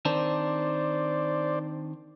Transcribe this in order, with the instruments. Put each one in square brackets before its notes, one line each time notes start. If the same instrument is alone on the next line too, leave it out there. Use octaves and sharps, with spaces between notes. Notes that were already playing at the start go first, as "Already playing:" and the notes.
[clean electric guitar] D#3 C4 D4 [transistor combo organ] C5 D5